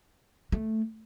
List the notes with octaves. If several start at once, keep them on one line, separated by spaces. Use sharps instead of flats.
A3